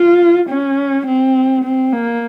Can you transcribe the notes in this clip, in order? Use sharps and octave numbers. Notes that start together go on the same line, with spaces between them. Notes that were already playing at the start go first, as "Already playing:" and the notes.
Already playing: F4
C#4
C4
C4
A#3